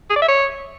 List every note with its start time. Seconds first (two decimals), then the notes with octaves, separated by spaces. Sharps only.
0.10 G#4
0.16 D5
0.22 E5
0.28 C#5